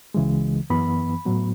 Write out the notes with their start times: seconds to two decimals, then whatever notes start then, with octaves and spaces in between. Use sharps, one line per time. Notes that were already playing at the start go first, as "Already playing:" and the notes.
0.14 C#2 C#3 E3 G#3
0.70 F#2 E3 B3 B5
1.25 A2 F#3 B3